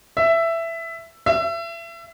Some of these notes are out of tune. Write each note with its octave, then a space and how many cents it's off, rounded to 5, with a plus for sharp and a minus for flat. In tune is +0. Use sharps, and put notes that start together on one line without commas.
E5 +10
E5 +30